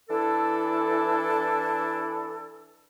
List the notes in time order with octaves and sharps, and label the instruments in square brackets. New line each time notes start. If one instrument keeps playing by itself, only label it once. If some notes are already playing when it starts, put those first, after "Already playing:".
[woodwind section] E3 D4 E4 A4